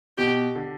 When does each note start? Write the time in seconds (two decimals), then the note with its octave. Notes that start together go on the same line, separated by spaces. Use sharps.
0.18 B2 G4
0.55 D3